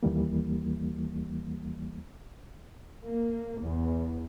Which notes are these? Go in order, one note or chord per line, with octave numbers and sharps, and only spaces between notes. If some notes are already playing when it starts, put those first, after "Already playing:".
D#2 E3 G3 A#3
A#3
E2